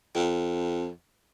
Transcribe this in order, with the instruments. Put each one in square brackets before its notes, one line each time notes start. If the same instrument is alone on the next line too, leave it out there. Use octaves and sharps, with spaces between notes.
[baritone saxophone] F2